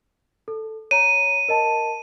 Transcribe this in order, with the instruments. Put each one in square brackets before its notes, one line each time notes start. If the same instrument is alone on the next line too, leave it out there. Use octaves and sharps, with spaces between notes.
[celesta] A4
[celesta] C#5 A#5 [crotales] D#7
[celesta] A#4 D#5 A5